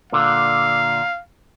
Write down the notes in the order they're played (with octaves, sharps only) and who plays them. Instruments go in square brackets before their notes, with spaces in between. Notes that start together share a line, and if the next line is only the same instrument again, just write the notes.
[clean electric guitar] A#2 D3 [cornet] F5